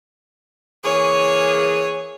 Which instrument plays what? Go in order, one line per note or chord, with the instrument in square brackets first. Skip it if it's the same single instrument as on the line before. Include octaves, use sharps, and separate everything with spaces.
[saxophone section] E3 A#3 G#4 [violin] C#5